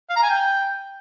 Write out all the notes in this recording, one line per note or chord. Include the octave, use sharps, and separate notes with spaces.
F5
A#5
G#5
G5